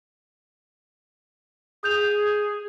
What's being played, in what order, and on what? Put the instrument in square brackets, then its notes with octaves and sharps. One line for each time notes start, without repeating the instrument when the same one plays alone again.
[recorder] G#4 [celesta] D#6 G6 F7